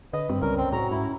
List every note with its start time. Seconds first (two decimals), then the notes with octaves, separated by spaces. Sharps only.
0.13 D3 B4 D#5
0.29 G2 C4
0.42 C#2 G3 C#4 A#4
0.57 C4
0.73 A2 F#4 A#5
0.91 G#2 E4